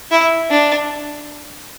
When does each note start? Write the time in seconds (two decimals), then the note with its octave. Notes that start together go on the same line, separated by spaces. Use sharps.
0.11 E4
0.50 D4